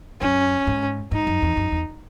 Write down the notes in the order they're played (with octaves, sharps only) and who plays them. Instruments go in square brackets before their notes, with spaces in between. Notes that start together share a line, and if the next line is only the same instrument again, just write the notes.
[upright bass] F#2 [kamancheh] C#4
[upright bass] G#2
[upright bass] G#2 [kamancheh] D#4
[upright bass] F#2
E2
F#2
E2